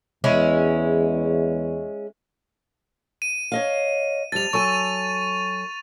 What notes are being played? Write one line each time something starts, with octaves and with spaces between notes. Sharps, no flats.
E2 G#3 C#4 E4
D#7
C#5 D#5 F5
F2 G3 A6 F7
F#3 A4 G#5 C#6 D#7